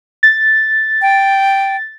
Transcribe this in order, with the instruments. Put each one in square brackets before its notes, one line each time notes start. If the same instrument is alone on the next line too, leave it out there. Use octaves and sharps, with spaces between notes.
[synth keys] A6
[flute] G5